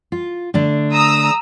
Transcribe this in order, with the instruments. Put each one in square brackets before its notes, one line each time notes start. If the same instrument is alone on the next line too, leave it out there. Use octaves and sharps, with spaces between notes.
[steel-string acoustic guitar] F4
D3 A3 D4
[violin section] A#5 D#6 E6